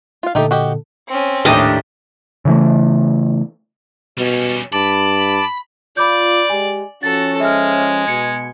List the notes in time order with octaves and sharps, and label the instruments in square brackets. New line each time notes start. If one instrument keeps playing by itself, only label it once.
[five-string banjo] F4 F5
[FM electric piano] A#2 D3 A4 [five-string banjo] A3 D#4 G4
[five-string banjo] F#4 G4 D#5
[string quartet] C4 C#4
[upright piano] A#1 D#2 A2 [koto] D4 D#4 G4 [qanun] D#5 A5
[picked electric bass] C#3 E3 A3
[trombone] B2 [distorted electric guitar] G3 C#4
[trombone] G2 [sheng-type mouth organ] A5 D6 [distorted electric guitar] B5
[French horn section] F4 [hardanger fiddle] D5 [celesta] B5 D6 G6
[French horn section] G#3 G4 [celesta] G#5
[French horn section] F3 C#4 [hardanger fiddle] F#4 A4 [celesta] A6
[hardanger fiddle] G#3 [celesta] E5 F6
[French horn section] B2 [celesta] G#6 C#7